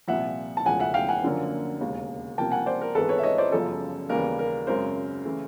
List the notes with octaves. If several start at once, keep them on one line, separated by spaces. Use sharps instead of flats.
C2 A#2 F3 E5 F#5
A5
E1 D2 C#3 F3 F#5 G#5
E5 F#5
F5 G5
F#5 G#5
F#1 F#2 D3 F3 A#3
E1 D#2 C#3
C2 C3 F3 A#3 G5 A5
F#5 G#5
C5 D5
A#4
G#1 G#2 E3 G#3 B3 A4 B4
B4 C#5
E5
C#5 D#5
C5 D5
G1 F#2 C#3 F3 A4
D#2 C#3 E3 G3 B3 A#4
A#4
G#1 F#2 C#3 A#4 C5
C#3 E3 A3